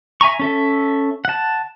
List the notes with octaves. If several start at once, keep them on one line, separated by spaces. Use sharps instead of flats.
E5 G#5 A#5 C#6
C#4 A4 E5
F#5 A5